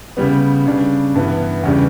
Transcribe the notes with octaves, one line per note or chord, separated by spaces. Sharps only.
C#3 G3 B3
C#3 G3 D4
G2 E3 B3
E2 C#3 G3 D4